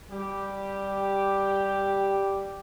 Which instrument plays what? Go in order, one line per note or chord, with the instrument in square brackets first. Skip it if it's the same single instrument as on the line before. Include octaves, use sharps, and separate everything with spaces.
[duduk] G3 [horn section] G4